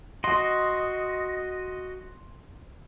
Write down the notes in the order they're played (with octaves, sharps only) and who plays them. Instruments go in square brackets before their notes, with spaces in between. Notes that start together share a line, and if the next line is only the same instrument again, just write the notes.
[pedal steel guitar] F#4 D#5 [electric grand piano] C6